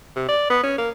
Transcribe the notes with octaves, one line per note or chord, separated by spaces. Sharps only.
C3
D5
B3
C#4
A#3